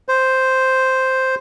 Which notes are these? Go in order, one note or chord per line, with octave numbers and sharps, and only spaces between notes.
C5